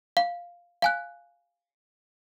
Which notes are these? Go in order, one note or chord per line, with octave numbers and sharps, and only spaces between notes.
F5
F5 G#5 F#6